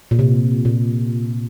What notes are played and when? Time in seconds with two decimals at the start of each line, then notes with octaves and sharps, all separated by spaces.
0.11 A#2
0.19 C3
0.65 A#2